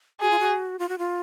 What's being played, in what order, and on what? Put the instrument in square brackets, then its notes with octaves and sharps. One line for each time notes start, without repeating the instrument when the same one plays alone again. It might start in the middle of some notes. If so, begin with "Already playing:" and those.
[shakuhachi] F#4 [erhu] G#4
[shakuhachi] F4
F#4
F4
F#4
F4